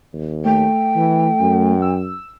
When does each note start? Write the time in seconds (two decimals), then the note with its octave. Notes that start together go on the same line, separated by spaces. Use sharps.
0.13 D#2
0.45 A3 G5
0.95 E3
1.40 F#2
1.82 E6